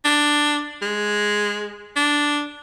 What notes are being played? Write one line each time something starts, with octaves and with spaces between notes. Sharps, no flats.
D4
G#3
D4